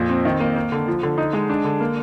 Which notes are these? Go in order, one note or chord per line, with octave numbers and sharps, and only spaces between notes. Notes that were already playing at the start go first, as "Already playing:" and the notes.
Already playing: F2 A#2
C4
D#3
A#3
A#3
D3
F3
D3
D#4
G#3
D4
D3
A#3